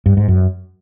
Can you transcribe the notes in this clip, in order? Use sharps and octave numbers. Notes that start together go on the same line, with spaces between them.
G2
G#2
F#2